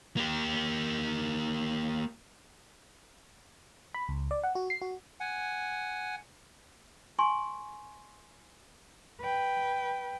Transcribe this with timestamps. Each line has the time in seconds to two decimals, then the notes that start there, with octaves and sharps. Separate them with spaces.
0.17 A#3 G4
3.95 B5
4.09 C#2
4.31 D5
4.44 F#5
4.55 F#4
4.70 C7
4.82 F#4
5.20 F#5 G#5
7.19 G#5 C6 C#6
9.21 B4 G5